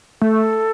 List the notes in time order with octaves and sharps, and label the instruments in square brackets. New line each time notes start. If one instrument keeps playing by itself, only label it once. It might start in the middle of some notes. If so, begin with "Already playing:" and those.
[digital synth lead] A3 [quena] A4